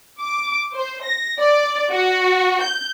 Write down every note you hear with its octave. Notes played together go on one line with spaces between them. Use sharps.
D6
C5
A#6
D5
F#4
G6